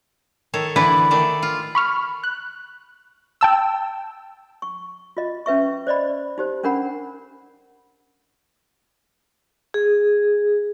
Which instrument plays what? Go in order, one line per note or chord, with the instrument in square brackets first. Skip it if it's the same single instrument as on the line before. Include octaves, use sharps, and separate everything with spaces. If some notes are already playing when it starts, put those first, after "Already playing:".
[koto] D#3 A4 C#5
D3 E3 E4 B4 D5 F#5
D#3 A3 D5
F4
[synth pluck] B5 C#6 F6
F#6
G5 A5 E6
[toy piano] C#6
F4 D#5
C#4 B4 E5 C#6
C5 D5 D#5 B5
D#4 G4 C5
C#4 D4 A#4 F#5 B5
[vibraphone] G#4